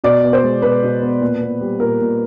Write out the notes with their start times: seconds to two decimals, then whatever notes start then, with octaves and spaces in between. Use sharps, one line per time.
0.04 B2 D5
0.23 B3
0.33 C5
0.43 G#3
0.62 B2 B4
0.83 B2
1.02 B3
1.21 A#2
1.41 B3
1.61 G3
1.80 A#2 A#4
2.00 A#2